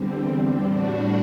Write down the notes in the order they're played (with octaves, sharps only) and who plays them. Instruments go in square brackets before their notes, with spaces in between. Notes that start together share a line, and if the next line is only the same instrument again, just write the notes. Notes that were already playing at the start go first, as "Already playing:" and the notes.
Already playing: [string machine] E2 D3 G3 C4
A2 G3 D4 F#4